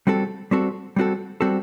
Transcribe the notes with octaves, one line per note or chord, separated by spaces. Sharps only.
G3 C4 F#4 A4
G3 C4 F#4 A4
G3 C4 F#4 A4
G3 C4 F#4 A4